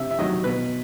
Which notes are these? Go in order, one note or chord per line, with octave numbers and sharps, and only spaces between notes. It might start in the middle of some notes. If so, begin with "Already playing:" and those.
Already playing: C3 E5
E5
D#3 F#3 D#5
B2 B4